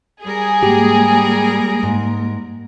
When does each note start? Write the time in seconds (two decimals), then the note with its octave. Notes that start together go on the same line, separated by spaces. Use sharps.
0.24 G3 G#4 A#4
0.62 G#2 G#3 A#3 G4
1.83 G#2